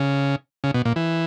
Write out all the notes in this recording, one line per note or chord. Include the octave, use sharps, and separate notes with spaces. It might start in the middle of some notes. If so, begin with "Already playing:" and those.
Already playing: C#3
C#3
B2
A#2
E3